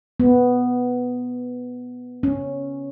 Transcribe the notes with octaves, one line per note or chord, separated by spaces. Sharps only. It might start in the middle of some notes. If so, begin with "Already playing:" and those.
B3
C#4